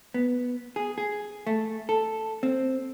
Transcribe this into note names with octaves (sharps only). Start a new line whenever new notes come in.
B3
G#4
G#4
A3
A4
C4